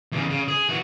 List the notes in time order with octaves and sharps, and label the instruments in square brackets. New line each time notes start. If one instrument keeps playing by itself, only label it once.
[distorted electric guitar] E2 C#3
C#3
G#4
E3 F#4